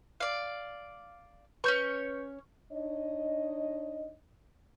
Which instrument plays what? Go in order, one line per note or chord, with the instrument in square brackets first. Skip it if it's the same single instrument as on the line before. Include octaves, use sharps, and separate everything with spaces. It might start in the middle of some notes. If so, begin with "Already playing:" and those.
[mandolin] D5 F5
[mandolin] C#4 C#5 C#6 [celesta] B4 G6
[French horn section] D4 D#4 C#5 D#5